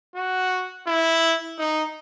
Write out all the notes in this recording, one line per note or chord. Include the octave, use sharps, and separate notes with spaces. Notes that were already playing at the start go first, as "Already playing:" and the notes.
F#4
E4
D#4